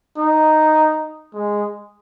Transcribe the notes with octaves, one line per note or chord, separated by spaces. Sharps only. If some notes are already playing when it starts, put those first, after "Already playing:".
D#4
G#3